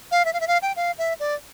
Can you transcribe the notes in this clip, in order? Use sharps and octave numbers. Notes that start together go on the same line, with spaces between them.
F5
E5
F5
E5
F5
G5
F5
E5
D5